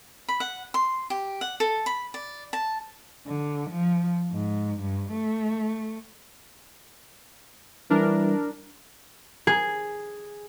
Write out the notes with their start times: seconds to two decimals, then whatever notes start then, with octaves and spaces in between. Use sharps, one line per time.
0.29 B5
0.40 F#5
0.74 C6
1.10 G4
1.41 F#5
1.60 A4
1.86 B5
2.14 D5
2.53 A5
3.27 D3
3.70 F3
4.32 G#2
4.80 G2
5.12 A3
7.90 E3 G3 D4 A#4
9.47 G#4